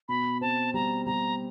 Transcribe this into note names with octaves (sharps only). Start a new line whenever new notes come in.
B2 B5
C4 A5
G3 A#5
G3 A#5